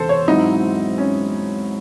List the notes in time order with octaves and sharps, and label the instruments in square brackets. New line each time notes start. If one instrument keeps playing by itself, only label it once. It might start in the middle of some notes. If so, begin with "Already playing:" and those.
Already playing: [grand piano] E1 E2 C3 [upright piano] A4 C5
[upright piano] C#5
[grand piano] G#2 F#3 C4 E4 [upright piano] D#4
[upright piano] C#4